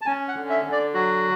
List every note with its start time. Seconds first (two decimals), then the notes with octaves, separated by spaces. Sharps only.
0.01 A5
0.06 C#4 G#5
0.28 F#5
0.35 D3
0.50 E5
0.66 D3
0.72 D5
0.94 F#3 F#4